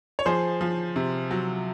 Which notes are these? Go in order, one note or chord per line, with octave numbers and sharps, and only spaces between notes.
C#5
F3 G#4 C5
F3
C3
F#3